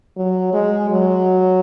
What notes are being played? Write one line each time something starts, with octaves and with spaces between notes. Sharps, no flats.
F#3
G#3
F#3